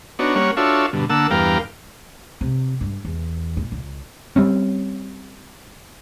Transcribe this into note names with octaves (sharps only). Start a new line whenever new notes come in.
B3 D4 D#4 F#4 C#5
G3 A#3 C#4 C#5 F#5
D4 F4 F#4 A4 C#5 E5
G2 B2 D3
D3 A#3 F#5 A5 E6
E2 G2 B3 A#4 F5 G5
C3
G2
E2
A#2
C#2
G3 C4 C#4